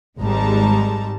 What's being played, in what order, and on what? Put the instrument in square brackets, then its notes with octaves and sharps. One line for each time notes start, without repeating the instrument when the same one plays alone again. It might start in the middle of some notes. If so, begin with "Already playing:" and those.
[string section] G#1 G#2 G3 G#3 A5 A#5